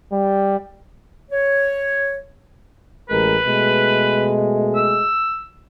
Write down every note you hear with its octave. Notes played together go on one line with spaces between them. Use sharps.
G3
C#5
A1 G#3 A#4 B4
B2 G#3 A3
E6